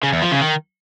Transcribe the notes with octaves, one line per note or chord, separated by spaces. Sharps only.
C#3
E2
F3
C#3
D#3